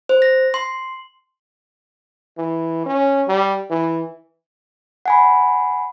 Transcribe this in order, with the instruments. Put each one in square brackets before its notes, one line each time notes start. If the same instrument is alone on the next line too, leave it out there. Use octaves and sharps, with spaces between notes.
[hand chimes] C5
A#6
C6
[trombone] E3
C#4
G3
E3
[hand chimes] F#5 G#5 B5